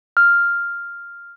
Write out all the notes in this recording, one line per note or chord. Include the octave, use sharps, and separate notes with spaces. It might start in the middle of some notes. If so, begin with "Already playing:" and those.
F6